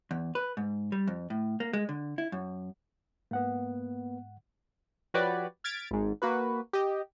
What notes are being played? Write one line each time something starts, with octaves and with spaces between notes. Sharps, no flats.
E2
B4
G#2
G3
F2
A2
A#3
G#3
D3
E4
F#2
G#2 A#3 B3 F#5
F3 F#4 G4 B4 C#5 D5
F6 G#6 A6 B6 D7
G#1 G#2
A#3 F#4 B4
G4 D#5